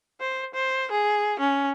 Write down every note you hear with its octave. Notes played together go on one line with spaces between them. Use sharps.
C5
C5
G#4
C#4